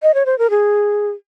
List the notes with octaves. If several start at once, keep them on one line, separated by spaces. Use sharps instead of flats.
D#5
C#5
C5
A#4
G#4